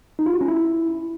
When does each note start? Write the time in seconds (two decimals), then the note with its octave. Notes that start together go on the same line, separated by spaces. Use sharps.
0.19 D#4
0.26 F4
0.34 F#4
0.41 C#4
0.48 E4